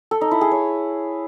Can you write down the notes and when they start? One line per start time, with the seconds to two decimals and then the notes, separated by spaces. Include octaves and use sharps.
0.11 A4
0.21 D#4
0.31 E4
0.41 G#4
0.51 C#5